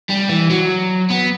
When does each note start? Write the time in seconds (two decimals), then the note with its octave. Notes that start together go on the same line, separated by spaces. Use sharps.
0.10 G3
0.29 E3
0.50 F#3
1.10 B3